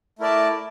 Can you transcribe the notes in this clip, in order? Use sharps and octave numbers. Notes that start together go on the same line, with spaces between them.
A3 E4 A#4 D5 A5